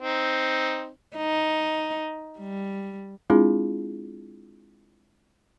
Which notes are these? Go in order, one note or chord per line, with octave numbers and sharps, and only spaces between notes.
C4 D#4
D#4
G3
G#3 C4 D4 E4 F4 G#4